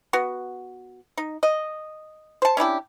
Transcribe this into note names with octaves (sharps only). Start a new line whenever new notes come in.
B3 F#4
D#4
D#5
C5 A5
C#4 D4 E4 G4